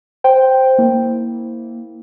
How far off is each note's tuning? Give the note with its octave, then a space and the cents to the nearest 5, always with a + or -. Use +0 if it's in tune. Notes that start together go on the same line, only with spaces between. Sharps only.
C5 +0 G5 +0
A#3 +0 E4 -15